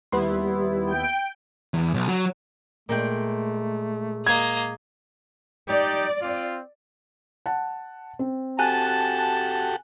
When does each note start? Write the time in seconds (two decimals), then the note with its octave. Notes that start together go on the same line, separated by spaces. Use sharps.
0.12 D#2 G3 B3 E4 B4 C6
0.86 G5
1.74 E2
1.94 B1
2.08 F#3
2.89 A#2 G#3 A3 G5
4.26 A#3 D#5 G#6
5.69 D#4 G4 D5
6.22 C4 F4
7.46 F#5 A5
8.19 C4
8.59 F#4 G4 A4 G#5 A5 F#6